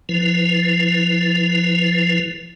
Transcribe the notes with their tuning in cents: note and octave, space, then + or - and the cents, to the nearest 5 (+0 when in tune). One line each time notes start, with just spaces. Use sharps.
F3 +0 E4 +0 B4 +15